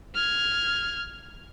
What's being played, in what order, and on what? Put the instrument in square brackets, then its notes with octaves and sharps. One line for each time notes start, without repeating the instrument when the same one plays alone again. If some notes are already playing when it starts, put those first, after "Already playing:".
[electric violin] F6 G#6